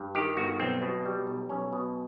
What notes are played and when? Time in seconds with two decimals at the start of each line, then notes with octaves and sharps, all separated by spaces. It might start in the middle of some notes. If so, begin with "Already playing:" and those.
Already playing: G2
0.15 D#3 G4
0.37 G1 F#4
0.60 B1 C4
0.82 B2
1.05 G3
1.27 B1
1.49 B1 C#4
1.73 B2